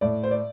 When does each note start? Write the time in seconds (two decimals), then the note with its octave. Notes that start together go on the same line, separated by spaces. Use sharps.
0.01 A2 D5
0.23 C5
0.31 D5